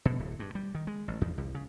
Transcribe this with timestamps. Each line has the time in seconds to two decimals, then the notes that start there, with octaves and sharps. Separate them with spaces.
0.05 B2
0.19 D1
0.39 G2
0.55 G3
0.75 D#3
0.87 G#3
1.08 A1
1.21 E2
1.38 C2
1.55 C#3